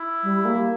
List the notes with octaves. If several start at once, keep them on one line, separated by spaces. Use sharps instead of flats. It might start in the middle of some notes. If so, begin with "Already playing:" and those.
Already playing: E4
G3
A#3